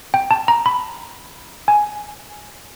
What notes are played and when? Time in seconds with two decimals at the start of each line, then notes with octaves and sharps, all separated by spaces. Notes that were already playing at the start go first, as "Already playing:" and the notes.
0.14 G5
0.31 A5
0.48 A#5
0.66 B5
1.68 G#5